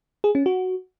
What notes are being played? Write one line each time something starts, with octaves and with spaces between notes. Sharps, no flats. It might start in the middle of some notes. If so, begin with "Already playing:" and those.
G#4
C#4
F#4